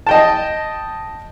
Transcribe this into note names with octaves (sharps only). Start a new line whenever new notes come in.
D#5 G5 A5